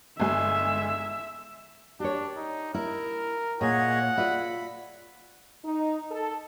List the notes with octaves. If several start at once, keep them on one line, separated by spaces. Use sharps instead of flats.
G1 G#3 E5 G#5
D4 G4 C#5
D#4
E4 A#4
A#2 G#4 C#5 D#5 F#5
F4 D5 E5 B5
D#4
A4